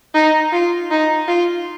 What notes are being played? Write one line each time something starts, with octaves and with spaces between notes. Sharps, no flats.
D#4
F4
D#4
F4